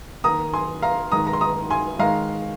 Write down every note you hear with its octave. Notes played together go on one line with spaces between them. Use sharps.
D#3 A#3 A#5 D#6
G#5 C6
F5 A#5
D#3 G#3 A#5 D#6
A#5
C6
A#5 D#6
G#5 C6
D#3 G#3 F5 A#5